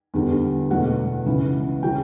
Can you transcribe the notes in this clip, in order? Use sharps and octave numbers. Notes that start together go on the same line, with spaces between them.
E2 D3 G3
E2 B2 F#3 A3 F#5
C#2 C#3 E3
C#3 F#3 G5